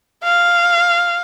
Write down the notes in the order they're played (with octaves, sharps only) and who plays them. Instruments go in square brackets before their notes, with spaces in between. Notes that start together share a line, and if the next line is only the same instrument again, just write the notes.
[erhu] F5